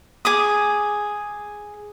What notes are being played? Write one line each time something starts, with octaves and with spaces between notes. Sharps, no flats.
G#4 D6 D#6